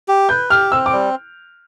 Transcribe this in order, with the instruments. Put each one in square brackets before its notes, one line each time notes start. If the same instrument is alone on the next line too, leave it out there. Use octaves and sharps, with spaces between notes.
[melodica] G4
[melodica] B4 [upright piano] G6
[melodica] G4 [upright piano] F6
[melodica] C4 [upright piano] E6
[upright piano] D6
[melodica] G3